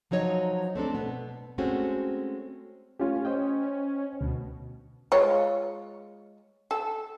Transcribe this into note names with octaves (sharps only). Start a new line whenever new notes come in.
F3 F#3 D#4 C#5 D#5
A3 C4 D4 A4
B2 B3
G#3 A3 C4 C#4 F#4
A3 C#4 F4 G4
C5 D#5 G5
D2 B2
G#3 F4 C#5
A4